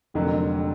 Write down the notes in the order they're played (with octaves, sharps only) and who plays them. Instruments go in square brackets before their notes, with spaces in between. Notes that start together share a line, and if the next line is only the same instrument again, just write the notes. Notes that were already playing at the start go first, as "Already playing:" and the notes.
[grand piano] F1 F2 D3 F#3 A#3